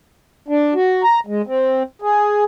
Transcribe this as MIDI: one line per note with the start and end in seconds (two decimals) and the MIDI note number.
0.48 0.74 62
0.75 1.03 66
1.03 1.20 82
1.27 1.42 56
1.47 1.83 60
2.02 2.44 68